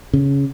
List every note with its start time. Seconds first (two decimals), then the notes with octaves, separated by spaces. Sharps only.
0.13 C#3